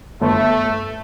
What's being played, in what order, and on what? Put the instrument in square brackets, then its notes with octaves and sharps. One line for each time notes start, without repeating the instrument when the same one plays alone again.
[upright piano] G1 [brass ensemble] A3